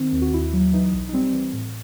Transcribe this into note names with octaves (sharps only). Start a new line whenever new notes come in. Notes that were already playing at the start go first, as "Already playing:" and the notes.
Already playing: D#3 C4
D#2
F#4
D#2 E4
F#3
E3 D#4
B1
D#4
G3 C4
E3
A2